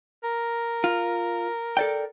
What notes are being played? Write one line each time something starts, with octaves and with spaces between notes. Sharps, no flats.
A#4
F4
A4 D5 G5